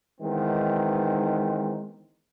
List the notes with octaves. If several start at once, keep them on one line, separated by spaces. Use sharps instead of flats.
D#3 E3 G#3 B3 C4 D#4